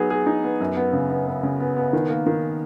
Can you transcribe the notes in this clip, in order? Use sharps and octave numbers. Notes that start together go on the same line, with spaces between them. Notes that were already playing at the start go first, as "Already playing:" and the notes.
Already playing: F#3 B3 D#4 G#4
G#4
D#4
B3
F#2
B3
C#3
B3
B3
C#3
B3
B3
D#3
A#3
D#3